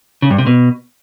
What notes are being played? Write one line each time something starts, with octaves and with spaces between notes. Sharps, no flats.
C#3
G2
C3
B2